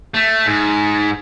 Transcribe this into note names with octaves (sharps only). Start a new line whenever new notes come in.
A3
G#2